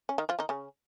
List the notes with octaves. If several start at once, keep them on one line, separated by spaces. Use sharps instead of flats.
C#4
D#3 D#4
F3 F4
D#3 D#4
C#3 C#4